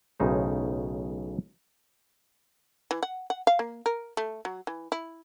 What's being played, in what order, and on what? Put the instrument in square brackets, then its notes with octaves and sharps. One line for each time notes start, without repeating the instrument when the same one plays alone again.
[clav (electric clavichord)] B1 A2 C#3 D#4 C5
[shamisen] E3
F#5
F#5
F5
A#3
A#4
A3
F#3
E3
E4